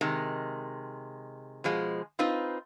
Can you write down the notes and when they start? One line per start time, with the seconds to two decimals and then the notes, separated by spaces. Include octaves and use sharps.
0.01 C3 D#3 G#3
1.64 B2 F3 G#3
2.19 C4 D#4 F4 B4